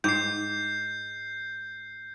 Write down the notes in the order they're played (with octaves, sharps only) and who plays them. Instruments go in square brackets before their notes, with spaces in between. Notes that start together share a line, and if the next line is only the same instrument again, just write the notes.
[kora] G#2 [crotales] G6 C7